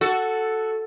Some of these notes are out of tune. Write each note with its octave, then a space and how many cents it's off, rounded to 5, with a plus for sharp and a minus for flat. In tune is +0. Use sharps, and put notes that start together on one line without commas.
F#4 +0 A4 +0